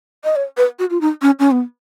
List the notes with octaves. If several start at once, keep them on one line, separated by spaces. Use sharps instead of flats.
D#5
C#5
B4
F#4
F4
D#4
C#4
C#4
B3